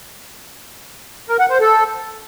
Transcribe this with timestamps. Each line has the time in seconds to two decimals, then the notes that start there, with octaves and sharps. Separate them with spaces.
1.29 A#4
1.39 F#5
1.50 C5
1.60 A4